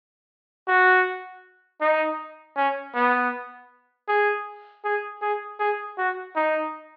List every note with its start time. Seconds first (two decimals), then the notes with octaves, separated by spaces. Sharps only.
0.68 F#4
1.81 D#4
2.57 C#4
2.95 B3
4.08 G#4
4.85 G#4
5.22 G#4
5.60 G#4
5.98 F#4
6.36 D#4